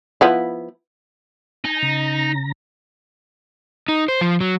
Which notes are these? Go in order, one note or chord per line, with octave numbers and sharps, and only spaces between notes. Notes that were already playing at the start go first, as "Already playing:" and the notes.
F3 B3 E4
D#4 G#5 A5
C#3 A#5 A#6
D#4
C5
F3
F#3